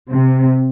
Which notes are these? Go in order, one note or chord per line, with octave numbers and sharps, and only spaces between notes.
C3